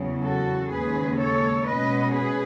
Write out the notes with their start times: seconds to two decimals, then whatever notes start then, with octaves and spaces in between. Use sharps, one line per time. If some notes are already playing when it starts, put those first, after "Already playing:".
Already playing: E2 C#3 F#3
0.24 F#4 A4
0.71 D#2 C#3 G#3 G#4 B4
1.19 A4 C#5
1.67 B2 G#3 C#4 B4 D#5
2.13 G#4 B4